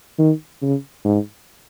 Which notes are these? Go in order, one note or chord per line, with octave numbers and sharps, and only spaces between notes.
D#3
C#3
G#2